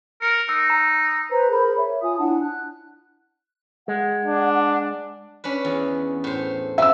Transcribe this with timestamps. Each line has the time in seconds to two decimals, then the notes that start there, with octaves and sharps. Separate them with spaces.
0.22 A#4 C#7
0.49 D#4 E6
0.70 A#5
1.30 B4 C5 A#5
1.50 G#4 A#4 C5 B5
1.77 C#5 E5
2.03 F4 G#5 D#6
2.19 D4 E4 F#5 A5
2.41 F#6
3.88 G#3 F#5
4.25 D4
5.44 C#4 D4 B4
5.65 E2
6.24 A2 C5
6.78 F#2 C4 E5 E6